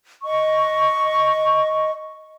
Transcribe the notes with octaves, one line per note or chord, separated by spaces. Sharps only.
D#5 C#6